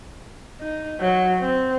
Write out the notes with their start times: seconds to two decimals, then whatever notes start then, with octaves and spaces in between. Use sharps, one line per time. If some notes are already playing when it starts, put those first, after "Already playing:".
0.61 D#4
1.01 F#3
1.40 C4